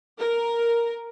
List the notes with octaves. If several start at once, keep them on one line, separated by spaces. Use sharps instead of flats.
A#4